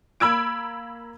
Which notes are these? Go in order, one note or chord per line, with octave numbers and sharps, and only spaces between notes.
A#3 B5 E6 G#6 D7